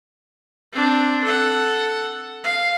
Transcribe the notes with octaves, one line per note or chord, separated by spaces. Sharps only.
C4 D4
A4 F#5
F5